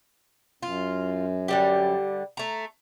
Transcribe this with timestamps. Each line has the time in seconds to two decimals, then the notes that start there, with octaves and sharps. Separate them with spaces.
0.63 F#2 F4
1.48 D3 G3 G4
2.37 A3 A#5